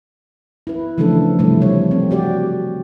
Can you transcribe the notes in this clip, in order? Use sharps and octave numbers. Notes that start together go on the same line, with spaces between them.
E4 B4
C#3 E3 F3 A3 D4 A4
C3 E3 F3 G3 A3 E4
G3 C#5
C4
F#4 G4 D5